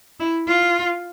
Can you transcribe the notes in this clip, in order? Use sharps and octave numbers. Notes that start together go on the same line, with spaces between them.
E4
F4